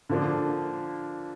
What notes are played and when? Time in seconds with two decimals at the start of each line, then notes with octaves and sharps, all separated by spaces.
0.09 D3 F3 A#3 D4